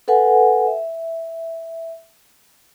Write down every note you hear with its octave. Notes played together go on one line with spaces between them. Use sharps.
A4 B4 F#5 G#5
E5